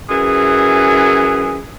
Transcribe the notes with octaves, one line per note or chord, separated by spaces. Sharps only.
F#2 E3 G#4